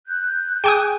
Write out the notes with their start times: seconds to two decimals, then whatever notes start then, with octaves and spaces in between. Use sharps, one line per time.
0.07 F#6 G6
0.64 G#4 G5 G#5 D6 D#6